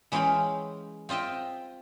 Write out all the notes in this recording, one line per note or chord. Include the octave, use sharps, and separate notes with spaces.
E3 G#3 C#4 F5 G5 B5
C4 F4 D#5 E5 G5